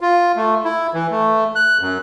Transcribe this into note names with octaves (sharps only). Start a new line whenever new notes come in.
F4
A3
E4
E3
A3
F#6
F#2